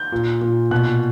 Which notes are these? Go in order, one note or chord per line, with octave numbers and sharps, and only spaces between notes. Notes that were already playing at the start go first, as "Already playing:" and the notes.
Already playing: G6
A#2
A#2
B2 F#6